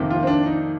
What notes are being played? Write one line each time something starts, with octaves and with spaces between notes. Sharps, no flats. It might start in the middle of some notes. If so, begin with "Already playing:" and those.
Already playing: F2 C3 D#3 A#3
F4
C4
D4
D#4